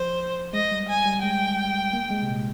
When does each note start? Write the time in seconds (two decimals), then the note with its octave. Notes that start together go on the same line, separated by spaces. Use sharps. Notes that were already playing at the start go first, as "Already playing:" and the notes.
Already playing: F3 C5
0.53 G#3 D#5
0.71 G3
0.89 G#5
1.06 G3
1.23 G#3 G5
1.93 A#3
2.10 G#3
2.22 C3
2.29 A#2